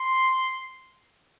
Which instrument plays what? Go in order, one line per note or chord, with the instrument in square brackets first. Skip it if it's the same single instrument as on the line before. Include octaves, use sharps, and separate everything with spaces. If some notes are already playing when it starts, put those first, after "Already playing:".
Already playing: [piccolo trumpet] C6